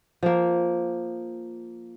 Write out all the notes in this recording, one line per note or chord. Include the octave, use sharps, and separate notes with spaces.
F3 A#3